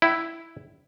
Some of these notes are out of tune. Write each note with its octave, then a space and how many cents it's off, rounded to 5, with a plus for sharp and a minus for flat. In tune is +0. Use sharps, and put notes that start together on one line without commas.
E4 +0 G5 -45